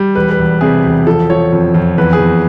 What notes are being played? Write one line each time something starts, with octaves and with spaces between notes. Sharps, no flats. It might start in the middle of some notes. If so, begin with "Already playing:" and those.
Already playing: G3
E1 B4
B4
E1
C3 G#4
E1
F3 A4
F3 C#5
F2
F2
E2 B4
G#4
E2